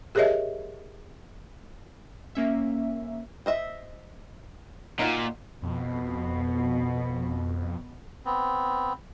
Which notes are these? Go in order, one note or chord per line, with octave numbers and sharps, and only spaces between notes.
G4 G#4 A#4 C#5 D#5 E5
A#3 C#4 E5
C5 D#5 E5
A#2 D#4 F4 F#4
F2 B2
B3 C4